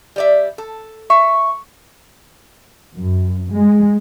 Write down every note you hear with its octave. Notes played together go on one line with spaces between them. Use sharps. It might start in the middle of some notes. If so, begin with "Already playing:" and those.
G3 D5 E5
A4
E5 C#6
F#2
G#3